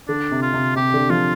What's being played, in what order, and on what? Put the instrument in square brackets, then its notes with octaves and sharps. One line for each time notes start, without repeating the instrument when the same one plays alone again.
[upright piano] D3 [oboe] D4
[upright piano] C3
[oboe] F4
[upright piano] C3
[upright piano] C3 [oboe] G4
[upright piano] D3
[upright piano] F3 [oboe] F4